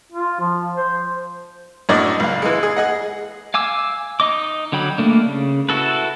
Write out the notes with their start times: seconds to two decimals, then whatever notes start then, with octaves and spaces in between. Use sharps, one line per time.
0.12 F4
0.41 F3
0.77 C5
1.89 F#2 A2 D4 D5 D#5
2.20 C#2 F5
2.42 E3 G#3
2.63 G#4
2.76 G#4 D#5 F#5
3.54 F5 G#5 D6 E6
4.20 D#4 D#5 D6
4.72 D3 F#3 G5 B5
4.98 A3 A#3 D4
5.24 C#3
5.69 E4 F#4 A4 B4